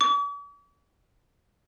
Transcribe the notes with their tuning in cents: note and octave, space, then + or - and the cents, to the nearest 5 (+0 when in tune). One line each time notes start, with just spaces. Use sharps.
D6 -45